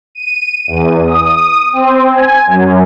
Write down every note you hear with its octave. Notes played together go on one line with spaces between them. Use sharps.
D#7
E2
D#6
C4
G#5
F#2